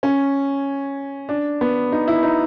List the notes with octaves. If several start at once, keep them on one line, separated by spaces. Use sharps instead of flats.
C#4
D4
B3
D#4
E4
D#4